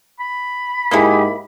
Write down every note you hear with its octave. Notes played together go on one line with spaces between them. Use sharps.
B5
G#2 A#3 D#4 E4 G4 G#4